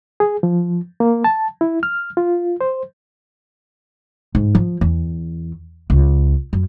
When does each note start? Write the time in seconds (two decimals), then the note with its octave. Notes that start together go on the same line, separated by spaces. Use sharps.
0.20 G#4
0.43 F3
1.00 A#3
1.24 A5
1.61 E4
1.83 F6
2.17 F4
2.61 C5
4.35 G#2
4.55 F3
4.81 E2
5.90 C#2
6.53 F#2